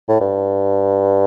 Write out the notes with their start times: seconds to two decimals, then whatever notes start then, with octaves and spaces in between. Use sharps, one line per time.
0.09 A2
0.21 G2